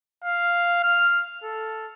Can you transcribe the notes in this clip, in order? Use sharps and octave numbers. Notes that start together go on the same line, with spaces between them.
F5
F6
A4